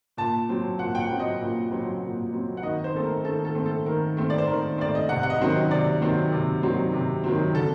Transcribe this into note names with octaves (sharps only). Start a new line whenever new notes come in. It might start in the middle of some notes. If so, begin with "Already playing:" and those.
A#2 A5
F#3 C4
A#2 F#5
G5
F#5
F#3 C4
D#5
A#2
F#3 C4
A#2
F#3 C4
F#5
D#3 D#5
C5
A3 C4 A4
A#4
D#3 A4
A4
A3 C4
A4
D#3 A#4
A3 C4
D5
C5
D#3 A#4
A3 C4 D5
D#5
C3 F#5
F#5
D#5
D#3 F#3 C4
D#5
C3 D5
D#3 F#3 C4
C3
D#3 F#3 C4
C3
D#3 F#3 C4
D3 A4